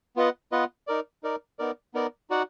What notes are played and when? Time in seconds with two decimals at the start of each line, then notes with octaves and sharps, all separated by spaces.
0.16 B3 F4 B4 D#5 F#5
0.52 B3 F4 B4 D#5 F#5
0.87 D#4 A#4 D5
1.23 D#4 A#4 D5
1.59 B3 D#4 A#4 D5
1.94 B3 D#4 A#4 D5
2.30 D#4 F#4 D5 F#5